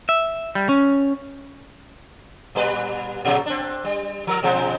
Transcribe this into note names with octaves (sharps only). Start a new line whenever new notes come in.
E5
G3
C#4
A#2 G3 B4
A#2 C#3 F#3
C4 D4
G3
F3 A#4
B2 F3 G#3